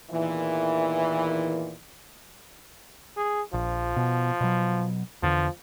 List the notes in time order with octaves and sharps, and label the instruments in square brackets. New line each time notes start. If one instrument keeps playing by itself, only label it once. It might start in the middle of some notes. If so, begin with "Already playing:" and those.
[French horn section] E2 A#2 D#3 E3
[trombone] G#4
[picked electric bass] A#1 [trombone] F3
[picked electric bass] B2
B2 F#3
[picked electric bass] E2 D3 [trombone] F3